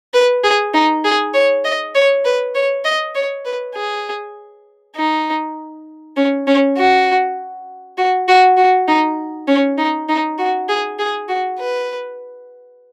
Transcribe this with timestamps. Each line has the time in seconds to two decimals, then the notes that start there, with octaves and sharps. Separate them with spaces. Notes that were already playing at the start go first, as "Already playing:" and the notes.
0.14 B4
0.44 G#4
0.74 D#4
1.05 G#4
1.34 C#5
1.65 D#5
1.95 C#5
2.25 B4
2.55 C#5
2.85 D#5
3.15 C#5
3.45 B4
3.75 G#4
4.96 D#4
6.17 C#4
6.47 C#4
6.77 F#4
7.98 F#4
8.28 F#4
8.57 F#4
8.88 D#4
9.48 C#4
9.78 D#4
10.09 D#4
10.38 F#4
10.69 G#4
10.99 G#4
11.28 F#4
11.59 B4